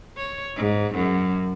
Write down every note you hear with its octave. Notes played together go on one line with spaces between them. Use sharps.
C#5
G#2
F#2